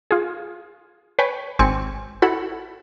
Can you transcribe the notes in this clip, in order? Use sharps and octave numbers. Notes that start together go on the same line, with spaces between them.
F4 G#4
B4 C#5 G5 G#5
G#1 C4 G#5 C#6
E4 F#4 A4 F#5 B5